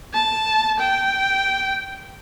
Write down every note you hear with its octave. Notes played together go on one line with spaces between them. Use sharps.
A5
G5